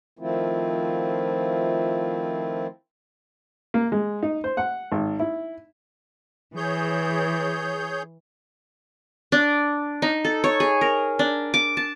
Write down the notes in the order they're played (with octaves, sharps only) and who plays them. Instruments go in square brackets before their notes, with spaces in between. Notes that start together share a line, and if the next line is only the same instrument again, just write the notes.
[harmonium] D#3 F3 A3 C4 E4 F4
[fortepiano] A#3
G#3
D#4
C5
F#5
G#1
E4
[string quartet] E3 [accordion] G#4 C#5 G6
[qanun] D4
D#4
A4
C#5
G#4
A#4
D4
D6
A5